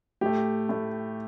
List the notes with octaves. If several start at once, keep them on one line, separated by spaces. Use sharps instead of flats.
A2 A3 G4
A2 A3